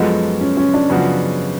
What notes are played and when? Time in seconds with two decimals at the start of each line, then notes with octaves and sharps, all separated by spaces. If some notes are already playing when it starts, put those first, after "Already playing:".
Already playing: F#2 F3 G#3 B3 F#4 A4
0.41 C#4
0.57 C#4
0.74 D4
0.90 F#2 C#3 F3 B3 F#4